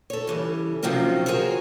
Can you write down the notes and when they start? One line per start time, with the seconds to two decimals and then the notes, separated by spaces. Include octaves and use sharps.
0.10 A4 C#5
0.27 C#3 E3 G3
0.83 C3 D#3 F3 F#3 C4 C#4
1.26 F#4 G#4 A#4 C5 C#5